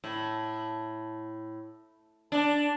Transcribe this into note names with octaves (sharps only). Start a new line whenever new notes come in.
A2
D4